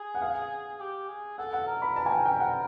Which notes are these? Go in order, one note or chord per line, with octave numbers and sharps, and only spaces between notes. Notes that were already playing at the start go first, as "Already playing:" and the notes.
Already playing: G#4
F#5
F5
G4
G#4
A4 F#5
F#5
A#4
B5
A5
G#5
G5
G5
F#5